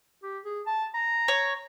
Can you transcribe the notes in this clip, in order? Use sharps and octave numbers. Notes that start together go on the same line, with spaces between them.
G4
G#4
A5
A#5
C#5